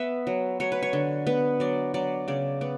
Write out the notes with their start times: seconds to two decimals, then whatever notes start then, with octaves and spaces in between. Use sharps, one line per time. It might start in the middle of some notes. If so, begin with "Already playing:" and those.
Already playing: B3 E5
0.27 F#3
0.60 F#3 C#5
0.72 B4
0.83 C#5
0.93 D3
1.27 B3 B4
1.60 F#3 D5
1.94 F#3 D5
2.28 C#3 D5
2.61 B3 D5